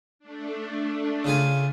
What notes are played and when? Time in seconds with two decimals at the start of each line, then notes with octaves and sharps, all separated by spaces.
0.19 A3 D4
1.24 C#3 F4 G#5